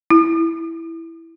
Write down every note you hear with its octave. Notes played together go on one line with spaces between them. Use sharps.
E4